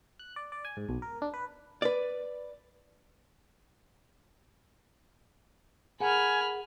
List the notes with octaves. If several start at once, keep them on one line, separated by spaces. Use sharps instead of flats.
F#6
D5
D5
G#5
G#2
B1
A#4
D4
B4
B4 D5
G#4 A#4 F#5 G#5 B5 F6